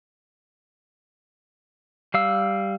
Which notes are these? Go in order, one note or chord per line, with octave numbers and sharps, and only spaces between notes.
G3 F5 E6